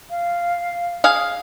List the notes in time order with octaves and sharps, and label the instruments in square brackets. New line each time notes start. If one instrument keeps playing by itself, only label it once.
[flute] F5
[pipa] G#4 F5